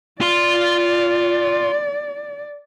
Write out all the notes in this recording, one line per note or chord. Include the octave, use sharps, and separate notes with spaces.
F4 D5 C6